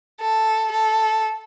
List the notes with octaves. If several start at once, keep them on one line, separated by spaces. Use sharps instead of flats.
A4
A4